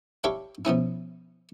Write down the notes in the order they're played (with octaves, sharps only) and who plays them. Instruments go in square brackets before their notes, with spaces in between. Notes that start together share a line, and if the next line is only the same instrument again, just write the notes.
[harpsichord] D4 G4 C#5 E5 F5 B5
B2 F3 C#4 E4